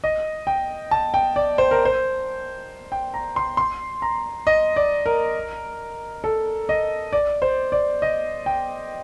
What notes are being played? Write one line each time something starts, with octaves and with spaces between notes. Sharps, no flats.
D#5
G5
A5
G5
D5
C5
A#4
C5
G5
A#5
C6
C6
A#5
D#5
D5
A#4
A4
D#5
D5
C5
D5
D#5
G5